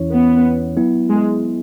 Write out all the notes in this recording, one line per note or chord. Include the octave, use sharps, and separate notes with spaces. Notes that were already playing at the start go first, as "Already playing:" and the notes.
Already playing: E2 E3 C#4 E4 C#5
B3
F#3 B3 E4
G#3